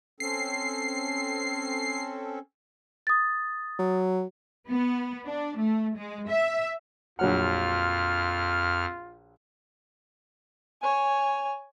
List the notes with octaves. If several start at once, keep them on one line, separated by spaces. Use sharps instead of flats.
C4 C#4 A4 C7
D#6 A6
F#3
B3
D4
A3
G#3
E5
A#1 F2 F#3 F4 F#5 F6
C#5 G#5